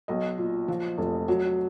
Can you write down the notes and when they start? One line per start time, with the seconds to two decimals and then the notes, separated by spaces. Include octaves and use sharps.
0.08 B1 D#5
0.38 A#2
0.68 F3
0.98 F1
1.28 F#3